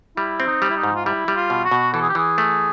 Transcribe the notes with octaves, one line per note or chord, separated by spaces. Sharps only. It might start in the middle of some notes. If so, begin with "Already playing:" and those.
G3 E4
C4
D#4
G3
E4
D#4
G#2
F4
G3 E4
G3
F4
B2
F#4
B2
E3 A4
G#4
G4
E3 G#4
A3